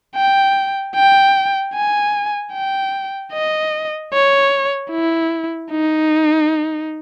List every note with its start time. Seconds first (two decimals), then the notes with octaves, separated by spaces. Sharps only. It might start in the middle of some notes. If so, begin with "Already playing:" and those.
0.16 G5
0.95 G5
1.74 G#5
2.53 G5
3.33 D#5
4.13 C#5
4.91 E4
5.71 D#4